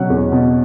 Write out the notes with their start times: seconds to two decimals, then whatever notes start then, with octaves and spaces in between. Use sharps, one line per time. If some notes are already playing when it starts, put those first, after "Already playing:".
Already playing: B2 F#3 C#4 F#5
0.10 E2
0.32 B2